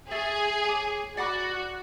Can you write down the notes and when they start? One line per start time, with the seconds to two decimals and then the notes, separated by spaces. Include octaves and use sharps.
0.11 G#4 A4 E5 G#5 C#6
0.64 C#5 G#5 D6
1.17 F#4 D5 F#5 B5 D6